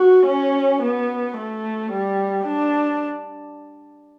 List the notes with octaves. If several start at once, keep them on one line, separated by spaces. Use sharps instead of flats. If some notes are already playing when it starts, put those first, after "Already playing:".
Already playing: F#4
C#4
B3
A3
G3
D4